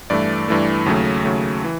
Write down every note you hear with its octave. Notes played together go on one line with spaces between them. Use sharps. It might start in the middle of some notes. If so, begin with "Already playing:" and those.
G2 E3 A3 D5
G2 E3 A3
D#2 C#3 F#3 A3
D#2 C#3 F#3 A3
E3